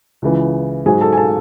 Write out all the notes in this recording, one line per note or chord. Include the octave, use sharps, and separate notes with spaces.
C#2 C#3 E3
G#2 F#3 G#4 G#5
A4 A5
G#5
A4 A5